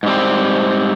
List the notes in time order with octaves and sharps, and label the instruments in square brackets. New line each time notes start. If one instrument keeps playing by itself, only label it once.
[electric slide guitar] G#2 G3 C4